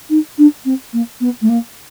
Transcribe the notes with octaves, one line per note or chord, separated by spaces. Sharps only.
D#4
D4
C4
A#3
B3
A3
A#3